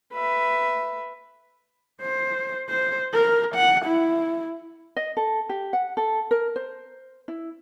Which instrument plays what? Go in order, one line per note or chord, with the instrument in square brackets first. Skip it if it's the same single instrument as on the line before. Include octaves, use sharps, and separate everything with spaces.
[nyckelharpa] B4 E5
[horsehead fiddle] C5
C5
A#4
F#5
E4
[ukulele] D#5
A4
G4
F#5
A4
A#4
C5
E4